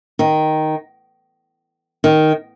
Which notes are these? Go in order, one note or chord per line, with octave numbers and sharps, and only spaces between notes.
D#3
D#3